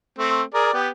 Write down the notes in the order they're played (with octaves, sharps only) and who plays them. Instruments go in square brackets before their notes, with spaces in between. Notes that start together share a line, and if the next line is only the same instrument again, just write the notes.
[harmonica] A3 C4
G#4 A#4 D5
B3 G4